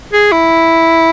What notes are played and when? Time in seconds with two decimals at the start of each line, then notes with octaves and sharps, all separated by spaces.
0.13 G#4
0.32 E4